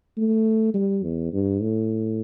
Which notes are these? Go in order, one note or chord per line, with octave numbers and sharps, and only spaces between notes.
A3
G3
E2
G2
A2